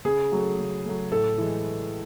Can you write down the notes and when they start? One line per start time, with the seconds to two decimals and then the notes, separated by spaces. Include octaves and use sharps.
0.05 C#3 G#4
0.32 F#3 A3
0.58 C#3
0.85 F#3 A3
1.11 A2 A4
1.38 E3 G#3